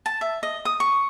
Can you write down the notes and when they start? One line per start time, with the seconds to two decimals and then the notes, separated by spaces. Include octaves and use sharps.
0.06 A5
0.21 E5
0.43 D#5
0.65 D#6
0.80 C#6